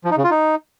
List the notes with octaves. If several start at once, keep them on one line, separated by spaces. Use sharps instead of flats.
F3
D#4
C#3
F4
D#4